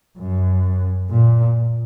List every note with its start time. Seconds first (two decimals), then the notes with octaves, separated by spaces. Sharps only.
0.18 F#2
1.10 A#2